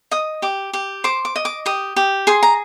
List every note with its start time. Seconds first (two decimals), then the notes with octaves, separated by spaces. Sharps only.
0.11 D#5 D#6
0.42 G4 D6
0.73 G4
1.04 C5 D6
1.25 D6
1.36 D#5
1.45 D6
1.66 G4 D#6
1.96 G4
2.27 G#4 C6
2.43 A#5